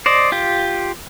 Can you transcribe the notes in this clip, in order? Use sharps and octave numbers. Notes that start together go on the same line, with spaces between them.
C5 D5 D#5
F4 G4